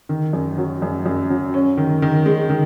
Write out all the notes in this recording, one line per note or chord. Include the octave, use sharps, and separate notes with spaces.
D#3
F#2
F#3
F#2
F#2
F#3
C#4
D#3
D#3
G#3
D#3